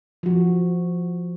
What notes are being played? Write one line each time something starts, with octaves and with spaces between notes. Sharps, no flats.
F3 F#4